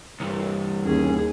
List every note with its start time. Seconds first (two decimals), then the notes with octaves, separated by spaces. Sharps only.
0.20 C2 G2
0.85 D#2 C#4 G#4